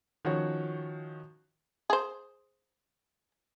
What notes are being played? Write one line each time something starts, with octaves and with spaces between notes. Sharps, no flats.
D#3 F3 C#4 F#4 C#5
G#4 C5